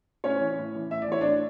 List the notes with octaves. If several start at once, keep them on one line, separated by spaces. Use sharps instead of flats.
A2 C#4 C#5
E3
A2
E3
A2 E5
D5
E3 C#5
A2 D4 D5